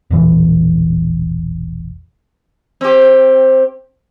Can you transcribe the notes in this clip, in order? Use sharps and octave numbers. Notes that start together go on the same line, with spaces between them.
E1 A#1 E3
C4 G4